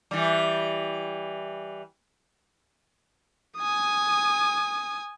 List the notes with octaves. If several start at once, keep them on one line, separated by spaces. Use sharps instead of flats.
E3 G3
G#5 D#6